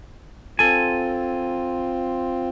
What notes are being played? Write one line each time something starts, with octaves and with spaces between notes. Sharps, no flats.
C4 F4 A4 G#5